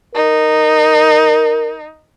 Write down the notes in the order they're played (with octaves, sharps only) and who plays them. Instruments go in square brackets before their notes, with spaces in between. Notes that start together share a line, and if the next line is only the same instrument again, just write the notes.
[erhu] D#4 [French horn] A#4